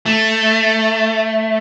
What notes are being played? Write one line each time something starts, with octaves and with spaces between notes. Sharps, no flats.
A3